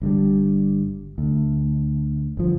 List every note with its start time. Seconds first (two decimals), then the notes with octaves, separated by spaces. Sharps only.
0.02 G1 G2 A#2 G3
1.18 D2
2.37 G1 F3